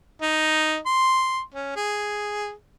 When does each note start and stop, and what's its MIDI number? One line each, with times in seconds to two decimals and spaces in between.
0.22 0.78 63
0.86 1.40 84
1.54 1.74 61
1.76 2.52 68